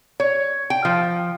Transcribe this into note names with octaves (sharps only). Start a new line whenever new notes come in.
C#5
G5
F3